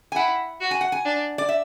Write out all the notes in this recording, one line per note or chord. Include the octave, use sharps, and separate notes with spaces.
G#5
E4 F#5
F#4
G#5
F#5
G#5
D4
D5
E5